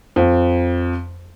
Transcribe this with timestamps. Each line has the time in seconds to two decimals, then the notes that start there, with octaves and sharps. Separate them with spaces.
0.16 F2